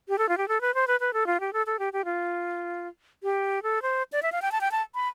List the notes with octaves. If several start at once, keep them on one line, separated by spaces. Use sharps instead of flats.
G4
A4
F4
G4
A4
B4
C5
B4
B4
A4
F4
G4
A4
A4
G4
G4
F4
G4
A4
C5
D5
E5
F5
G5
A5
G5
A5
B5